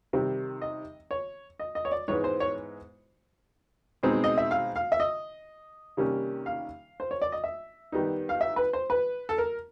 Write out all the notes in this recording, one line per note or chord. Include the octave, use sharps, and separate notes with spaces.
C3 D#3 G3 C4
D#5
C#5
D#5
D#5
C#5
D5
G#2 E3 G#3 B3 C#5
C5
C#5
B2 G#3 C4 D#4
D#5
E5
F5
F5
E5
D#5
C3 D#3 G3 A#3 C#4
F5
C5
C#5
D5
D#5
E5
D#3 G3 B3 D#4
F5
E5
B4
C5
B4
A4
A#4